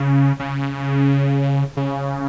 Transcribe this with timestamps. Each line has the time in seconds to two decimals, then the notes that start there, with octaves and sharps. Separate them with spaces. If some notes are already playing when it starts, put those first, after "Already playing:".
Already playing: C#3
0.39 C#3
1.77 C#3